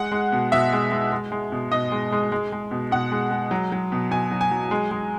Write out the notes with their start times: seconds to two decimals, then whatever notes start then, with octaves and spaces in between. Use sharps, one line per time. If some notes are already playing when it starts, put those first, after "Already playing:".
Already playing: G#3 F#5
0.12 G#3
0.32 B2
0.52 B2 E5
0.73 G#3
0.91 G#3
1.12 G#3
1.32 G#3
1.52 B2
1.72 B2 D#5
1.92 G#3
2.12 G#3
2.32 G#3
2.52 G#3
2.71 B2
2.92 B2 F#5
3.12 G#3
3.31 G#3
3.51 F#3
3.72 F#3
3.92 B2
4.11 B2 G#5
4.32 F#3
4.41 G#5
4.51 F#3
4.71 G#3
4.91 G#3